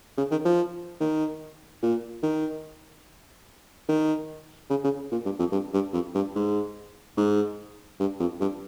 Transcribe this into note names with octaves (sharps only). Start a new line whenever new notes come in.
C#3
D#3
F3
D#3
A#2
D#3
D#3
C#3
C#3
A#2
G2
F2
G2
G2
F2
G2
G#2
G#2
G2
F2
G2